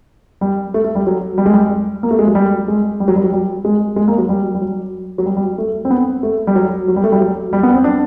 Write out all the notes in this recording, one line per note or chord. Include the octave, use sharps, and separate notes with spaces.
G3
A3
A3
G3
F#3
G3
G#3
G3
A#3
A3
G#3
F#3
G3
G#3
G3
F#3
G3
F#3
G3
G#3
G#3
A#3
F#3
G3
G3
F#3
F#3
G3
G3
A3
C4
B3
A3
G3
F#3
F#3
G3
A3
G3
F#3
G3
B3
C4
D4